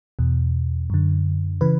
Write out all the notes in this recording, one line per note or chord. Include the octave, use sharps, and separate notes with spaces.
E2 B2
F#2 D3
C#3 E3 B4